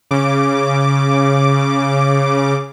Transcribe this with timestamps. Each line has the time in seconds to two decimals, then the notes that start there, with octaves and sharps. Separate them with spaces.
0.11 C#3 D6